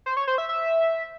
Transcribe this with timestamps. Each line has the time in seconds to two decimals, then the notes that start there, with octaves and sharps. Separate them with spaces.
0.06 C5
0.17 C#5
0.27 C5
0.38 E5
0.49 E5